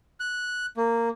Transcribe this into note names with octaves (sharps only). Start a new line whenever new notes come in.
F#6
A#3